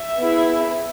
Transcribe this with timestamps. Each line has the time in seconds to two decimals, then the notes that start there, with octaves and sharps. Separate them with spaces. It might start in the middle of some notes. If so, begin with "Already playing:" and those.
Already playing: E5
0.19 B3 E4 G#4